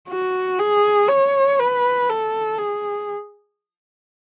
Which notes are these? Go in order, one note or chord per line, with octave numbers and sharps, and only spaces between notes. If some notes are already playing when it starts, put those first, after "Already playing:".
F#4
G#4
C#5
B4
A4
G#4